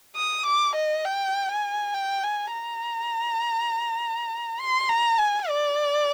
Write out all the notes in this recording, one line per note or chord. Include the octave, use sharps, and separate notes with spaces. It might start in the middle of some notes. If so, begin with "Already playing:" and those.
D#6
D6
D#5
G5
G#5
G5
G#5
A#5
C6
A#5
G#5
D5